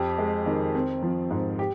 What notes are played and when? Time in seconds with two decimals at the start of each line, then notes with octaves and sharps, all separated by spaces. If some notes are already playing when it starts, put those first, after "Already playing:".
Already playing: F2 G4
0.18 G#3
0.46 D#3
0.75 C4
1.03 F3
1.31 G#2
1.59 G4